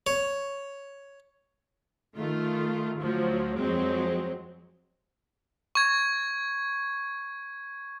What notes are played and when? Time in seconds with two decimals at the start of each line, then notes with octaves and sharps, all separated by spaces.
0.07 C#5
2.16 D#3 A3 F4
3.01 D2 F3 F#3
3.56 F2 F#3 G#3 C4
5.75 C#6 G#6